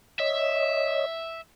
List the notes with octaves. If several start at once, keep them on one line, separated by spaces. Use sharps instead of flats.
C#5 D#5 E5